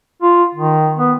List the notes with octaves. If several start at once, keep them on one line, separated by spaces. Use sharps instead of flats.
F4
D#3
B3